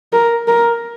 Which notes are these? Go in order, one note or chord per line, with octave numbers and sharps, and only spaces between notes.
A#4
A#4